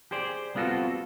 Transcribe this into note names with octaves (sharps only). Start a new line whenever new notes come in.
G4 G#4 C5 D5
G3 B3 C4 F4 F#4 A4